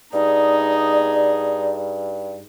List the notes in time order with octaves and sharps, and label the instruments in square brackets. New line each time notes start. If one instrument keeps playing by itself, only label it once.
[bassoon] G2 [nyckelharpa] D#4 G#4 [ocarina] D5